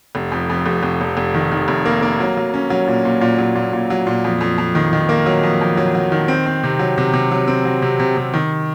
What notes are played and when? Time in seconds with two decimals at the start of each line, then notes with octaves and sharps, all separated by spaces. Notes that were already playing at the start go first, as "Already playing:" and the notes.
0.15 F1
0.32 F2
0.50 F2
0.66 F1
0.83 F1
1.01 F1
1.17 F1
1.34 D#3
1.52 D#3
1.68 F1
1.85 A#3
2.02 A#3
2.20 F#3
2.37 F#3
2.54 C#4
2.70 F#3
2.88 A#2
3.05 A#2
3.21 A#2
3.38 F#3
3.55 A#2
3.73 A#2
3.90 F#3
4.07 A#2
4.24 F2
4.41 F2
4.58 F2
4.75 D#3
4.93 D#3
5.09 A#3
5.26 F#3
5.43 F2
5.61 F2
5.77 F#3
5.95 F#3
6.12 D#3
6.28 C4
6.46 C4
6.64 C3
6.79 F#3
6.98 C3
7.13 C3
7.31 F#3
7.48 C4
7.65 F#3
7.82 C3
7.99 C3
8.17 C3
8.34 D#3